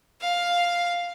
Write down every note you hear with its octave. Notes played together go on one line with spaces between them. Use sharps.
F5